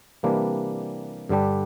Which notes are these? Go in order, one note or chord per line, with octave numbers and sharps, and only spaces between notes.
C3 E3 G3 A#3 D4
G2 D3 G3 D4 G4